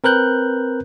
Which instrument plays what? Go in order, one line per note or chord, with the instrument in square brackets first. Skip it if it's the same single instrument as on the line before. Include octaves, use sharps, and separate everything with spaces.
[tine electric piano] C4 A#4 B4 F#6 G6